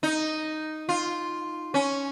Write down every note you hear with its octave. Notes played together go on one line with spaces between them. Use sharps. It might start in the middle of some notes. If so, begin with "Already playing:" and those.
D#4
F4
C#4